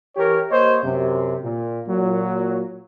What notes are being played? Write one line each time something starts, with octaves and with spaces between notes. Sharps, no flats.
E3 G4 A#4 C#5
A#3 G4 C5 C#5 D#5
F#2 C3
A#2
A#2 F#3